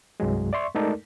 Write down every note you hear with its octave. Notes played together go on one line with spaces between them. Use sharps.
C2 G2 F#3 G#3
D5 E5 C6 C#6
G#3 A3 D#4 A4 A#4 D5